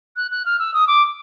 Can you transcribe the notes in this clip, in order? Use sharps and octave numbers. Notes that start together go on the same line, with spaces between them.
F#6
F#6
F6
E6
D#6
D6